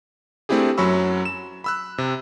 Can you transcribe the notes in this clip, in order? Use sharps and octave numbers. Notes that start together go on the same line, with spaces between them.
A3 C4 D4 E4 G4 G#4
F#2 F#3 C#4 B5 C#6 E6
E7
B5 E6 F#6
C3